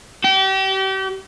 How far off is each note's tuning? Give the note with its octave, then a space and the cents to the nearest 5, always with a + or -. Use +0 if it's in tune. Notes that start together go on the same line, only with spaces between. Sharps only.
G4 -35